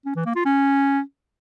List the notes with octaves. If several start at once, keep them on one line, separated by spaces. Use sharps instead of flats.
C#4
E3
A#3
F4
C#4